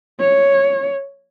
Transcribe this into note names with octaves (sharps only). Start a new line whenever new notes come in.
C#5